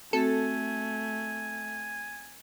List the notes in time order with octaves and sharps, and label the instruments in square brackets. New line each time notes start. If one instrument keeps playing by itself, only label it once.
[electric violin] A3 [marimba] C4 F#4 [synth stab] A4 [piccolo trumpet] G#5